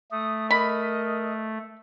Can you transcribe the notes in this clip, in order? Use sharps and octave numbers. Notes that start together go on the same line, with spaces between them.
A3 D#6
A#4 D#5 B5